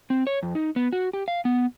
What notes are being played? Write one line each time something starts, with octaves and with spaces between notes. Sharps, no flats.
C4
C#5
F2
D#4
B3
F#4
G4
F5
B3